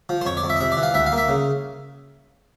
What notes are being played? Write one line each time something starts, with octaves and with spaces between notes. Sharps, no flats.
F3
C5
F2 C#5
D5
F2
E5
D#5
C3 E5
D5
E3
F5
D2 E5
F5
A#3
E5
C#3